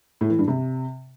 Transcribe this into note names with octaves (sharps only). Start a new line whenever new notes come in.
A2
E3
G2
C3